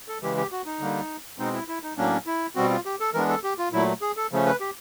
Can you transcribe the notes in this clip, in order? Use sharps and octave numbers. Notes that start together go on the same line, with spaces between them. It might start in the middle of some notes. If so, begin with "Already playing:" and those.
A4
C#3 E3 G#3 G4
G4
F#4
D#4
D3 G3 A#3
B2 G#3 C4 D#4
E4
E4
D#4
A2 F#3 A#3 C#4 D4
E4
B2 G3 C4 F#4
F4
G4
A4
E3 G#3 B3 D4 A#4
A4
G4
F4
A#2 F#3 A3 E4
G#4
A4
C#3 F3 A3 C#4
B4
G4